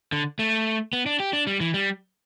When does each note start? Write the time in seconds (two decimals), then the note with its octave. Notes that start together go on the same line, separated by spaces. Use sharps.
0.12 D3
0.39 A3
0.93 B3
1.06 D4
1.20 G4
1.33 D4
1.47 G3
1.60 E3
1.74 G3